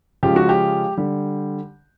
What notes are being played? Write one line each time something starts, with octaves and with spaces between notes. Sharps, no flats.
C#3 F3 G#3 G4
F#4
G4
D3 G3